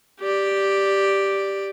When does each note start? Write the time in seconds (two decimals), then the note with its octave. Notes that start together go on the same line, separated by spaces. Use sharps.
0.20 G4 D5